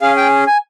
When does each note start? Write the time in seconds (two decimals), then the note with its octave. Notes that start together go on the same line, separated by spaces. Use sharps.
0.02 C#4 G#4 F5
0.17 G5
0.47 G#5